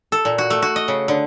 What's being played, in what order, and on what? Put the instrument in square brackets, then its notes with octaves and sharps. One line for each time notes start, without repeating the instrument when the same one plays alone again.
[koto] A4
A#2
F#4
A3
F#4
D#5
C#3
D3